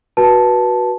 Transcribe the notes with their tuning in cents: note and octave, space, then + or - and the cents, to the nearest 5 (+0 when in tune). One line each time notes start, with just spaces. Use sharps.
F#4 +0 B4 -25 A5 -5